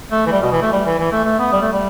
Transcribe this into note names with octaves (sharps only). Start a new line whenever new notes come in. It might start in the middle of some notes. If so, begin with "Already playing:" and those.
A3
E3
G3
B2
E3
A3
G3
E3
E3
A3
A3
B3
G3
A3
G3